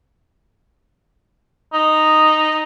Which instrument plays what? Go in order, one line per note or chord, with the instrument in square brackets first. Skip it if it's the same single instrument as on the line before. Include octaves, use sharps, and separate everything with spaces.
[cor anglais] D#4